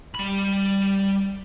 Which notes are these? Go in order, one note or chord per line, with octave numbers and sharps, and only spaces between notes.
G3 B5